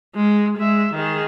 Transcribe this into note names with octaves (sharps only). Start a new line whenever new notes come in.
G#3
G#3 E5
D#3 G#4